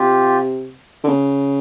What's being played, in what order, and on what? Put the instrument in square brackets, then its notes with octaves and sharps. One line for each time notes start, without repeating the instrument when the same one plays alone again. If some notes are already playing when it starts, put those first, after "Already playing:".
Already playing: [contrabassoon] C3 [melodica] F4 G4
[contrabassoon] D3
C#3